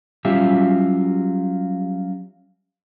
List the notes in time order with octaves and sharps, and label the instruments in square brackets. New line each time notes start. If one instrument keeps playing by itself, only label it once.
[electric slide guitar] F#3 G3 C#4 F4 G4 E5